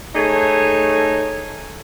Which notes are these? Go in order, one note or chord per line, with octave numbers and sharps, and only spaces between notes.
A3 D#4 G#4 C#5